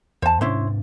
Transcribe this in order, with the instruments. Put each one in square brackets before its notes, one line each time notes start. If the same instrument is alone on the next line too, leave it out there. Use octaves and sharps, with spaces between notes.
[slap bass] E2 [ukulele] C5 A5
[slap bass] G#2 C3 D4 [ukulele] C#4 E4 C5